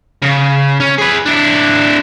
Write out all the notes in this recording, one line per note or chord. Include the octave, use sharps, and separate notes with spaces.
C#3
C#4
G#4 B4
D4 E4